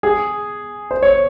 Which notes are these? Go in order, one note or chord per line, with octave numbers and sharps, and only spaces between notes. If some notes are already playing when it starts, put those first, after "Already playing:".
G#4
C5
C#5